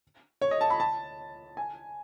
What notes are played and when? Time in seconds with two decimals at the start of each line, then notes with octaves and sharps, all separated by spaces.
0.42 C#5
0.51 D#5
0.61 A5
0.70 B5
0.80 A5
1.57 G#5